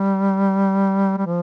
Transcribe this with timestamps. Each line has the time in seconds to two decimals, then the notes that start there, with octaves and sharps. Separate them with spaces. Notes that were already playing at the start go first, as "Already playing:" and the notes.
Already playing: G3
1.18 G3
1.26 F3